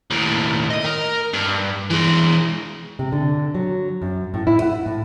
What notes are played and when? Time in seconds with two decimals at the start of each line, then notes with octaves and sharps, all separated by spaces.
0.10 D#2 A2
0.71 D#5
0.85 A#4
1.33 G2
1.91 E3 G#3
2.99 C3
3.12 D3
3.55 F#3
4.02 F#2
4.34 A2
4.47 E4
4.62 F#5
4.86 A2